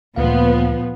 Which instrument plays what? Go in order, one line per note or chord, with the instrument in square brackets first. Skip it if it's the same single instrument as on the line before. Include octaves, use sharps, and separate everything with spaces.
[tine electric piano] D2 F5 [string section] A#2 F3 B3